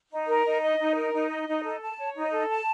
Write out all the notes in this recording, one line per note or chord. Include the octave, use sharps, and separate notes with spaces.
D#4
A#4
D#4
D#5
D#4
A#4
D#4
D#5
D#4
A4
A5
C#5
D#4
A4
A5